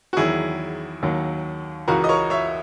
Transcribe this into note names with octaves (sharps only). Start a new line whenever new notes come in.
F#4
E2 D#3 F#3 E4 G#4
D#2 D#3 F#3
C#2 C#3 E3 F#4 A#4
D#5
A#4 C#5
C#5 E5